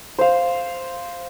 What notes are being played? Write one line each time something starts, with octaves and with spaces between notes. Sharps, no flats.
C5 F5